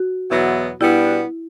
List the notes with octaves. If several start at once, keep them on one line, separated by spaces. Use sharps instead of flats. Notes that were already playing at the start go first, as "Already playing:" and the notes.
Already playing: F#4
E2 B2 F#3 B3 E4
B2 G3 B3 D4 E4 F#4